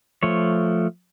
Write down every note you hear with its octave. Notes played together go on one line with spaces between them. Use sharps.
F3 A3 C#5